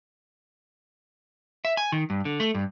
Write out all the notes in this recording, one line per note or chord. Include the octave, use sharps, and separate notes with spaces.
E5
G#5
D#3
G2
D3
A3
G2